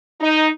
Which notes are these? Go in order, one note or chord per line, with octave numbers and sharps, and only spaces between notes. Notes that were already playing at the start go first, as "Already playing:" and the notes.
D#4